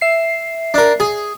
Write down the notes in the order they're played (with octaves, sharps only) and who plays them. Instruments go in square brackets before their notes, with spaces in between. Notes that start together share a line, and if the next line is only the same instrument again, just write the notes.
[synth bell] E5 C7
[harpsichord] D4 A#4
G#4